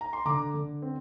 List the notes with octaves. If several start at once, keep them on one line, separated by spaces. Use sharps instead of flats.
A#5
C6
D3 A#5 D6
D3
C4